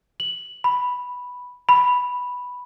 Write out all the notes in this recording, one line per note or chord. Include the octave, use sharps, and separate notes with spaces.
F#7
B5
B5